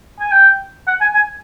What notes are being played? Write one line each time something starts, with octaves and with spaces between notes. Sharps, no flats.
G#5
G5
F#5
G#5
G#5